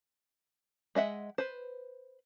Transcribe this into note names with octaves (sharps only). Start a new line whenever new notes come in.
G#3 D#5 E5 F#5
B4 C5